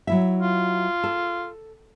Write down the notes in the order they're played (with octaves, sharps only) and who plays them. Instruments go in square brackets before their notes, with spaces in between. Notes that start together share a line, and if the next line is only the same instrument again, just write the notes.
[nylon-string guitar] F#3 E4 E5
[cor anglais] F4
[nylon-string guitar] A4